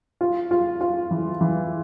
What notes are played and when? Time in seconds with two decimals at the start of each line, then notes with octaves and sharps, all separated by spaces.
0.21 F4
0.51 F4
0.81 F4
1.11 E3
1.41 E3